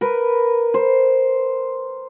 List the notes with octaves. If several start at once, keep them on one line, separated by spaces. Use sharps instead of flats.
A#4 B4
C5